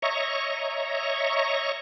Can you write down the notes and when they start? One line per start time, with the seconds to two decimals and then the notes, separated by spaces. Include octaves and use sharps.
0.02 C#5 D#5 E5 A#5 C#6